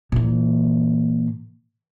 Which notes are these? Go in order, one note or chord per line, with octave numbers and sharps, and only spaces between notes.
A#2 E3